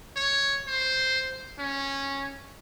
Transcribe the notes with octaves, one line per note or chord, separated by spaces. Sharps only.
C#5
C5
C#4